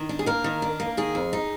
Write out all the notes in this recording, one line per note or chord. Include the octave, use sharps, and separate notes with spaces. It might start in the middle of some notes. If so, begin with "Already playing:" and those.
Already playing: D#3
D4
G#4
A#3 A#4
D#3
D4
A#3
D#3 G#4
F2
D#4